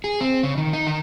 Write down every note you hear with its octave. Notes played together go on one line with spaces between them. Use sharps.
G#4
C4
C#3
D#3
D#4
D#3